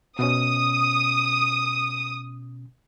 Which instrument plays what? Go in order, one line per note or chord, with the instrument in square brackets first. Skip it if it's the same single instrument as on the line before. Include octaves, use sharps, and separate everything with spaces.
[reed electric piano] B2 C#4 [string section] D#6